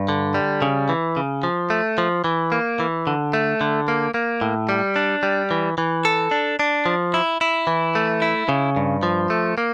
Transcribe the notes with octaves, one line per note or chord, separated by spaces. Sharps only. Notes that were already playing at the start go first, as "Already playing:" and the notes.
Already playing: G2
D3
G3
C#3
E3
C#3
F3
A3
F3
E3
A#3
E3
D3
A3
D3
A#3
A#3
A2
G3
D4
G3
E3
E3
A4
D4
D4
F3
E4
E4
E3
A3
E4
C#3
G2
F3
A3
A#3